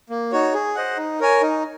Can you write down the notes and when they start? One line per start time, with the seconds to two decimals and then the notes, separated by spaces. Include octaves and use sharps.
0.10 A#3
0.32 D#4 F#4 C#5
0.54 G#4
0.75 C5 D#5 F#5
0.97 D#4
1.20 A#4 C#5 G#5
1.41 D#4